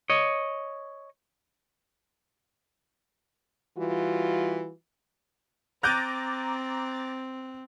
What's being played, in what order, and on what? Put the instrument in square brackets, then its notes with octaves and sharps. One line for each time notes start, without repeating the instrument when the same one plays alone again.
[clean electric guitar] C#5 D#5
[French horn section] E3 G3 F4 F#4
[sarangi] C4 [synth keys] A#5 D6 A6 [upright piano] F#6 G6 D#7